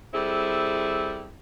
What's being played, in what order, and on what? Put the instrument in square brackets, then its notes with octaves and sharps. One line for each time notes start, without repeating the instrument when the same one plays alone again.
[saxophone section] G3 C4 E4 G#4 A4